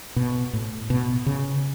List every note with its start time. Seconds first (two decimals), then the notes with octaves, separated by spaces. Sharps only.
0.16 B2
0.53 A2
0.90 B2
1.26 C#3